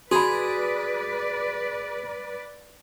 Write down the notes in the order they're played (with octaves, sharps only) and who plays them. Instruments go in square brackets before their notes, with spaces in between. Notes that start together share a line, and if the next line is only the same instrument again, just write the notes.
[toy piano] F#4 B5 [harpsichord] G#4 [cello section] B4 D5